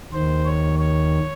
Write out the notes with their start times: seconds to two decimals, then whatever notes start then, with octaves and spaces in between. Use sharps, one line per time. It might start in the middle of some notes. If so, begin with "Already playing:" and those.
0.12 D#2 D#3 C5
0.46 C#5
0.79 C#5